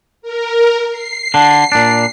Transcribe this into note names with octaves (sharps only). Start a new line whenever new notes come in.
A#4
C7
D3 D4
A#2 D4